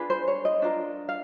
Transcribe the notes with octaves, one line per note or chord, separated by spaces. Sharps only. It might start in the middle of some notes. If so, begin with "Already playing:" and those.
Already playing: D4 F4 G#4 B4
C5
C#5
D#5
D4 F4 A#4
F5